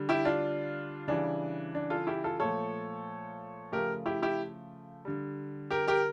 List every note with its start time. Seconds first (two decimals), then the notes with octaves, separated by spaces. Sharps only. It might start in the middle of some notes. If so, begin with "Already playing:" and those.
Already playing: D3 G3
0.09 E4 G4
0.25 D4 F4
1.08 C#3 E3 G3 D4
1.75 D4
1.90 F4 A4
2.07 E4 G4
2.24 F4 A4
2.40 A#2 F3 A3 A4 C#5
3.72 C#3 F3 A3 G4 A#4
4.06 E4 G4
4.22 E4 G4
5.05 D3 G3
5.71 G4 A#4
5.88 G4 A#4